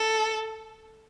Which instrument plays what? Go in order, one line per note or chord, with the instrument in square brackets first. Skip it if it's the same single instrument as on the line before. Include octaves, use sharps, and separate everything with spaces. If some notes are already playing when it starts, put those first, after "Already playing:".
Already playing: [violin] A4